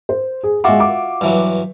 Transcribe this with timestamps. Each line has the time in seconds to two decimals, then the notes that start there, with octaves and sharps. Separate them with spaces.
0.09 C5
0.43 G#4
0.64 G#3 F4 F#4 E5 D6
0.80 D6
1.21 G2 E3 F#3